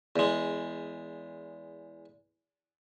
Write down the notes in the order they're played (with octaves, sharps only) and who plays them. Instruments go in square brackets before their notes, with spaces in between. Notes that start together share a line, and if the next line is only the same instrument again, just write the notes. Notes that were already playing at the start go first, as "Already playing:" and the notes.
[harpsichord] E2 G#3